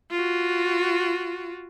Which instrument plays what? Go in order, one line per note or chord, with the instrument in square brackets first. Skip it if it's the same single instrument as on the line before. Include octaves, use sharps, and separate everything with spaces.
[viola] F4 F#4